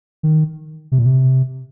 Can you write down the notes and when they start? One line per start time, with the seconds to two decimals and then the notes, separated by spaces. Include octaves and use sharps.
0.23 D#3
0.92 C3
0.98 A#2
1.06 C3